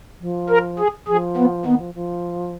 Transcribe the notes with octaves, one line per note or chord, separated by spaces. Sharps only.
F3
A#4
G#4
F3 G#4
B3
D#3 B3
F3
F3